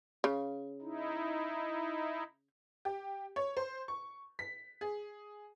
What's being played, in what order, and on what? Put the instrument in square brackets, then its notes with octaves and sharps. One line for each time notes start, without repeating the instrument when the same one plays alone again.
[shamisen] C#3
[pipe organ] D#4 E4
[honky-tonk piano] G4
C#5
C5
C#6
B6
G#4